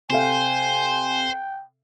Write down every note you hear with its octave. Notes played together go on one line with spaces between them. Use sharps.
C3 A4 C5 F5 G5 G#5